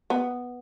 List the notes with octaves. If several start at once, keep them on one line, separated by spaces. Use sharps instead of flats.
B3